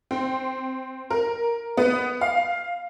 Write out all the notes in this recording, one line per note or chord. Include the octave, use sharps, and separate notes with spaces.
C4
A#4
B3
F5